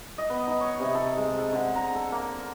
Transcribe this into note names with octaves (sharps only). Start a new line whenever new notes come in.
D#5
B3
D#4
C#5
C3
A4
G#3
A4
D3
A#5
A4
A#3